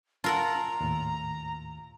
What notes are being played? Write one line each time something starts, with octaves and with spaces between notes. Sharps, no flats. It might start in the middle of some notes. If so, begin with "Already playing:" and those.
F4 A#4 F#5 A5 A#5 E6
D#2 A2